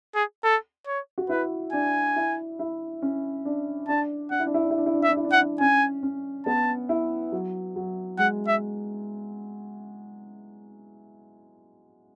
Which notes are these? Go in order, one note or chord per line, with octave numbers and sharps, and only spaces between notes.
G#4
A4
C#5
F#4
E4 B4
D4 G#5
E4
E4
C#4
D4
D4 A5
D4 F#5
E4
D4
E4
D4
E4
D4
E4
D4
E4 E5
D4
E4
D4
E4 F#5
D4
C#4 G#5
C#4
B3 A5
E4
F#3
F#3
G#3 F#5
E5